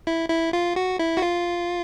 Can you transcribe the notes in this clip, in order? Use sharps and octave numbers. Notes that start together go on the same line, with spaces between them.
E4
E4
F4
F#4
E4
F#4
F4